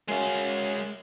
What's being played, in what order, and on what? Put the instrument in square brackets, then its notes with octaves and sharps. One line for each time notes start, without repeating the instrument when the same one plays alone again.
[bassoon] F#2 [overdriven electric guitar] G#3 F5